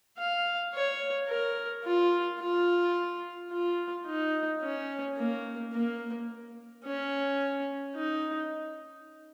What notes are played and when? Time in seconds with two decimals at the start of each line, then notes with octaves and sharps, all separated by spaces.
0.18 F5
0.73 C#5
1.29 A#4
1.84 F4
2.39 F4
3.51 F4
4.06 D#4
4.62 C#4
5.17 A#3
5.73 A#3
6.84 C#4
7.95 D#4